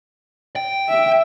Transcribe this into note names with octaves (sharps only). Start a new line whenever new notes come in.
G5
E5